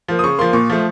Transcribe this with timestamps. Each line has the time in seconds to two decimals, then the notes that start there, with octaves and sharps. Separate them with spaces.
0.08 F3 A#3
0.19 D#6
0.24 C#3 C#6
0.39 F3 A#3 C6
0.53 A#2 C#6
0.70 F3 A3